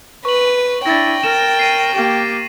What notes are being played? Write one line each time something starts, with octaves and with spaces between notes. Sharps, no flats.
B4 C#6 F#7
D4 E4 G5 A6 A#6
A#4 E7
C7 D#7
A#3 G4